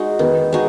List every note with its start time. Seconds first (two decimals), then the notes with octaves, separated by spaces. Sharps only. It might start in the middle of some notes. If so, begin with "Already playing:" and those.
Already playing: G#3 D#4 F#4
0.19 D#3 B3
0.53 G#3 D#4 F#4